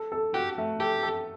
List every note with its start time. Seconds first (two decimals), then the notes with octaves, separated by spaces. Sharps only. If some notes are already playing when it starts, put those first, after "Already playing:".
Already playing: A4
0.12 A4
0.34 F#4 G4
0.58 A3
0.80 G4 A4
1.03 A4